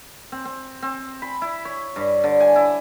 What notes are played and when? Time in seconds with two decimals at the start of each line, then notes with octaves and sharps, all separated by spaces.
0.32 C4
0.45 C4
0.82 C4
1.22 B5
1.42 E4
1.65 C#5
1.96 G2
2.24 D3
2.40 G#5
2.56 E4